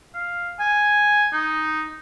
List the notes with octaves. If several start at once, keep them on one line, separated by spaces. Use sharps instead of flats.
F5
G#5
D#4